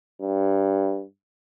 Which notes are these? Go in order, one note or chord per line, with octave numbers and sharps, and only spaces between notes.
G2